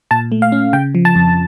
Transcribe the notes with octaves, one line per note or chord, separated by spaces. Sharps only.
A#2 A5
A3
F5
C#4
C#3 G5
F3
A5
F2